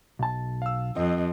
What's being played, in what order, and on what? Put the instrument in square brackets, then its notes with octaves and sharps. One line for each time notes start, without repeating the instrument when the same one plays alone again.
[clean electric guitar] B1 A5
[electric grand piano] F5 E6
[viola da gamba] F2 [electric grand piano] C4 D#5